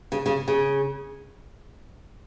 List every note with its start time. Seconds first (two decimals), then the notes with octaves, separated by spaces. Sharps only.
0.12 C#3
0.26 C#3
0.48 C#3